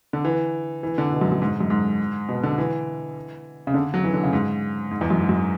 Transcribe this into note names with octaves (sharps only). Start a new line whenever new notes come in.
D3
E3
E3
D3
B2
F#2
F#2
G#2
F#2
G#2
B2
D3
E3
C#3
D3
F#3
E3
D3
C#3
G#2
G#2
E2
F#2
G#2
F#2